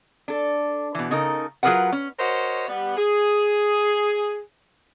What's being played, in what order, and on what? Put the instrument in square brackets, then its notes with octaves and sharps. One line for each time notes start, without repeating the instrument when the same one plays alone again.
[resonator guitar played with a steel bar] D4 A4
B2 E3
C#3 D#4 A4 A#4
F#3 F4 G#4 A#4 B4 F#5
C#4
[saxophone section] F#4 A#4 C5 C#5 D#5
G3 B3
G#4